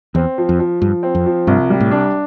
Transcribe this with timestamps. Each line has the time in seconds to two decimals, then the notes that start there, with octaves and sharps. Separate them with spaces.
0.15 E2 C4
0.38 F3
0.49 F2
0.59 F3
0.81 G2 F3
1.03 C4
1.15 F2
1.26 F3
1.47 C2 G2
1.70 G3
1.80 A2
1.91 D4